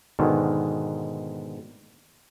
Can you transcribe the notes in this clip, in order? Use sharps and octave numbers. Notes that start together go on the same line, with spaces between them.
G#2 B2 D3 D#3